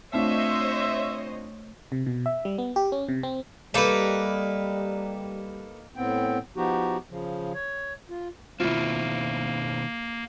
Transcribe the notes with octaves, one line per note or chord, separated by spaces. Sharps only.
A3 C4 D4 F4 C5 C#5 D#5 E5
C3
B2
E5
G3
B3
G4
C#4
C3
C4
G3 A#3 D#4 A4 B4
A2 B3 C4 G5
F3 B3 D#4 F#4 G4
C#3 F3
C#5
F4
B2 D#3 A#3 C4 E4 F4